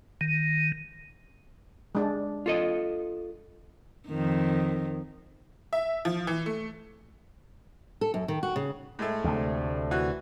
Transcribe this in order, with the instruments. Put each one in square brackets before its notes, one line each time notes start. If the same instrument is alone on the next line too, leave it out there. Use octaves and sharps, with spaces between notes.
[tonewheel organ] D#3
[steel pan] G#3 D4
[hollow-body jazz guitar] F4 A4 D#5
[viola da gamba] F2 D#3
[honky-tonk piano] E5
F3
E3
A3
[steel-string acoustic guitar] A4
F#2
D#3
F#4
C#3
[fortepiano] A2 G#3 A3
[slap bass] D2 C3
[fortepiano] E3 F#4 F#6